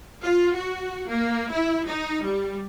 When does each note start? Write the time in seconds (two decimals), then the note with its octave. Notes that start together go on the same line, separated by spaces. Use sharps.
0.23 F4
0.55 F#4
1.08 A#3
1.50 E4
1.87 D#4
2.24 G3